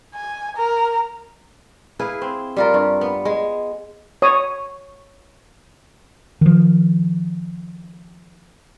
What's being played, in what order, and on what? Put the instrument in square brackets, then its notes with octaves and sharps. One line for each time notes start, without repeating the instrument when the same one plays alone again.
[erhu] G#5
A#4
[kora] E4 G#4 B4 F5
C4
G3 F4 A#4
G2
B3
G#3
[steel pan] C#5 D#6
[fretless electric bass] D#3 F3